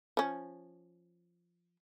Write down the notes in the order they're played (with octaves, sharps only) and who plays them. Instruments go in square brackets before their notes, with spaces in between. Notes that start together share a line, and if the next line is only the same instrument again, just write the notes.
[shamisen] F3 C#4